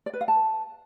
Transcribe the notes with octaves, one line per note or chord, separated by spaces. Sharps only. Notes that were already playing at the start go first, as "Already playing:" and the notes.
D5
B4
F5
A5